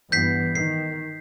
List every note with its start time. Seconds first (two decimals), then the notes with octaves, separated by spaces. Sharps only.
0.12 G2 E3 B3 G6 B6 C7
0.55 D#3 C7